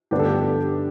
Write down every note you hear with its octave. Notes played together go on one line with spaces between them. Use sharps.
G2 D3 B3 D4 G4
A4
G4